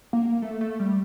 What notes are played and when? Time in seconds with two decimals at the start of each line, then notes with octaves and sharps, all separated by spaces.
0.13 A#3
0.42 A3
0.61 A3
0.79 G3